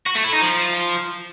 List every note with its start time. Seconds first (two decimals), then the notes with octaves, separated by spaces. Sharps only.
0.06 F#4
0.15 A3
0.24 E4
0.33 D#4
0.42 F3